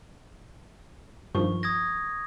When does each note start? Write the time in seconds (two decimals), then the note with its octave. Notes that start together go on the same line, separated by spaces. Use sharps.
1.35 G2 D#3 F3 C#6
1.63 D#6 G#6 A#6